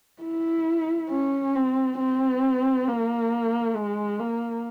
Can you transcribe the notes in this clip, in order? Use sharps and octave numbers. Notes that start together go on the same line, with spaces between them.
E4
C#4
C4
C4
A#3
G#3
A#3